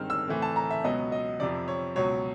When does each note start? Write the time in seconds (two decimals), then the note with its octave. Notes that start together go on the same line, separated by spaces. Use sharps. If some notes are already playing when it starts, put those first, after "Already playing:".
Already playing: G2 D#3 G#3 C4 F6
0.10 E6
0.28 A2 E3 A3 C4
0.42 A5
0.56 A#5
0.70 E5
0.84 C#2 B2 F#3 B3 D#5
1.12 D#5
1.40 F2 C3 F3 D5
1.68 C#5
1.96 C#2 B2 F#3 C#5